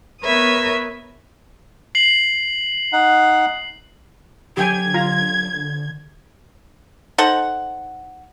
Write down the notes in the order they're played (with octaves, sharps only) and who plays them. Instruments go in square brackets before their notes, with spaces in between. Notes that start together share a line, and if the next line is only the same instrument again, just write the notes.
[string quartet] B3 A#4 B4 C#5 E5 D#6
[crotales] C7 F#7
[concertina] D#4 F#5
[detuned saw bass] D3 [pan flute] F#3 [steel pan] G4 G5 G#5 [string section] G#6
[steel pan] F4 A#5
[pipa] D#4 A4 C5 F#5